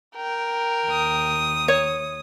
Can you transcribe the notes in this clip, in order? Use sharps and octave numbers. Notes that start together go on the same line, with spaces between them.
A#4 G5
D#2 D#6
C#5